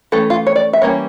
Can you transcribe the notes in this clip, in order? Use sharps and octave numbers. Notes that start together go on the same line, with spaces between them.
E3 A3 C#4 A4
F4
C#5
D5
E5
E3 G3 A#3 C#4 C#5